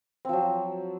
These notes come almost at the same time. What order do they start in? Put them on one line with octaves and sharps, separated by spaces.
C4 F3 F#3